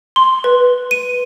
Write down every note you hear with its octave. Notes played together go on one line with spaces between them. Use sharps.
C6
B4
D#7